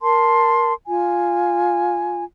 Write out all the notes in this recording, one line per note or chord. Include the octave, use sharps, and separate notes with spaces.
A#4 A5 C6
F4 G#5